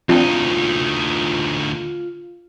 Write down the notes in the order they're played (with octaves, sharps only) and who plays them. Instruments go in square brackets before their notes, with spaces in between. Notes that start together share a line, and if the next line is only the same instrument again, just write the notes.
[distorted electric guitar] D2 D#4 [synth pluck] F3 C4 D4 [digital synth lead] F4